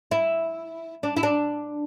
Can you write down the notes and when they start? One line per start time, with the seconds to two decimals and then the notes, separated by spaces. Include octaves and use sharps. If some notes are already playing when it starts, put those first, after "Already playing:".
0.11 E4
1.03 D4
1.17 E4
1.23 D4